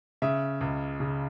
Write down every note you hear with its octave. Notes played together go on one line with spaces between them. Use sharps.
C#3 E5
C#2
C#3